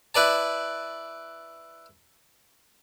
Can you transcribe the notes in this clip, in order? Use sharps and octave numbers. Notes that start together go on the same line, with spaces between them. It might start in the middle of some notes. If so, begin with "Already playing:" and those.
E4 B4 D5 A5